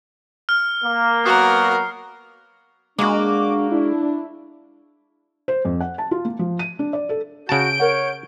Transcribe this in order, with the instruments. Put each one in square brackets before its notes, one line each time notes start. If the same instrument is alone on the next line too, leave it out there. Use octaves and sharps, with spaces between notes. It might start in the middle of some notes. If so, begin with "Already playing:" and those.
[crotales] F6
[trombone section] A#3
[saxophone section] F#3 B3 F#4 [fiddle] A#4 [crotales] C7
[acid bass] G#3 [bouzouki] A#3 F#4 [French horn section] D4 [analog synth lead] D6
[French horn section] D4 [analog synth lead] E4
[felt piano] C5
F2
F#5
A5
F4
A#3
F3
D#7
D4
D5
A4
[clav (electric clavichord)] C#3 A5 [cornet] F#4 [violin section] G6 D7
[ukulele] A#4 F#5 [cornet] C#5